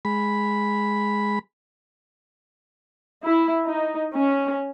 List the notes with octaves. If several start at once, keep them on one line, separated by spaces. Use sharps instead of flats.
G#3 B5
E4
D#4
C#4